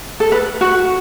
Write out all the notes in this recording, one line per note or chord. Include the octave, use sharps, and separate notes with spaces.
A4
B4
F#4